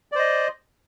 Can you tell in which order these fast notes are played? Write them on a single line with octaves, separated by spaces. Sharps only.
D5 C5 D#5